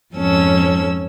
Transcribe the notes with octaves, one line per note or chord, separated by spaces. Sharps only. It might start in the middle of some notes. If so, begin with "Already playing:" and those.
F2 G#2 C#4 A4 E6